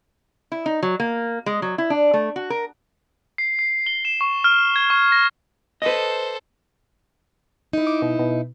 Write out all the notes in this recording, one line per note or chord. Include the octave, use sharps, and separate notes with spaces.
E4
D#4
F#3
A#3
G#3
F#3
E4
D4
A3
F#4
A#4
C7
C7
G7
E7
C#6
F6
G#6
C#6
A#6
A4 B4 C5 D#5
D#4 E4
D6
B2
B2